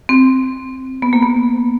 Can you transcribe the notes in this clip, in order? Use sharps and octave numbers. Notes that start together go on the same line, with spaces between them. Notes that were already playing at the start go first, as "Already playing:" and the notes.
C4
B3
A#3
B3